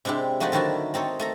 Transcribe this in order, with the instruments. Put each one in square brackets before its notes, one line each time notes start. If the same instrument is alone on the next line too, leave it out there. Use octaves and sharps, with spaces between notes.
[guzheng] C3 G#3 D4 E4 G4
F3 A3 D#4 F#4 G4 D5
D3 D#3 F#3 E4 F#4 A5
C4 D#4 A4 C#5
A3 A4 A#5